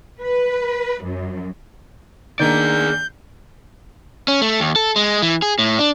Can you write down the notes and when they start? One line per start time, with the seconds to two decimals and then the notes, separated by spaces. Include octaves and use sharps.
0.21 B4
1.03 F#2
2.39 D#3 A#3 D4 G#4 D5 G6
4.28 C#4
4.42 A3
4.60 D#2
4.76 A4
4.96 G#3
5.22 E3
5.42 G#4
5.59 A2
5.79 D4